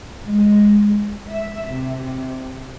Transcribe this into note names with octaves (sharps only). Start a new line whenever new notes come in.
G#3
E5
C3